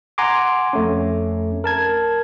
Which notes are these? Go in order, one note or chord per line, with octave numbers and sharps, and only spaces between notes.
F#5 G#5 A#5 C6 D6
F2 A3 C#4
A#4 A5 G#6